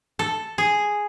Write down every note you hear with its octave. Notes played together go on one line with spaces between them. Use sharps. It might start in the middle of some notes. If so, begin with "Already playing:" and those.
A4
G#4